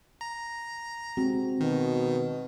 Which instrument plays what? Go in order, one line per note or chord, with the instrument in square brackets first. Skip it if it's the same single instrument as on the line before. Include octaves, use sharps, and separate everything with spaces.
[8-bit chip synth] A#5
[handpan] G#3 C4 F#4
[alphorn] B2 [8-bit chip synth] D#3